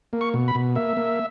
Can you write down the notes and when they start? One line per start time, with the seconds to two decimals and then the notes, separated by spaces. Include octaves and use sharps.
0.13 A#3
0.21 C#6
0.34 B2
0.48 B5
0.55 B2
0.75 A#3 E5
0.97 A#3